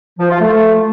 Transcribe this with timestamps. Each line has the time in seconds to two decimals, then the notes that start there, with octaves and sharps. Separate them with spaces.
0.19 F3
0.30 F4
0.41 A3